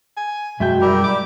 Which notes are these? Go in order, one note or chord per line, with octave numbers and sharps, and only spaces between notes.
G#5
F#2 B2 G#3 E5 G5
G3 E4 G4 A#4
D6